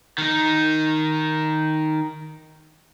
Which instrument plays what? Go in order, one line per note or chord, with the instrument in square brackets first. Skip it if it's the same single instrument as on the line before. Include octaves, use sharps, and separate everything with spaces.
[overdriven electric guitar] D#3 D#4